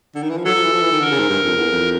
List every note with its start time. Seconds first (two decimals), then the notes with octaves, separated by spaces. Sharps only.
0.15 D3
0.23 D#3
0.30 E3
0.37 F3
0.45 F#3 A4
0.55 F3
0.64 E3
0.73 F3
0.83 E3
0.92 D#3
1.01 D3 A#4
1.11 C#3
1.19 G#2
1.29 G2
1.43 F2
1.57 E2
1.72 F2